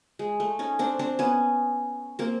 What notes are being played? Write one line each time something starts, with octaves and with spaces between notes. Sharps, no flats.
G#3
A3
C#4 D#4
C4 D4
C4 D4
B3 C#4
A#3 C4